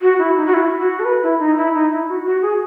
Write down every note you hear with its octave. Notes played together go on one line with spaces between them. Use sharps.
F#4
E4
D#4
F#4
E4
F#4
A4
B4
E4
D#4
E4
D#4
E4
F#4
F#4
G#4